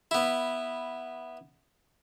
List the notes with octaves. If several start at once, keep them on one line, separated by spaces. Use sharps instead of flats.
B3 E4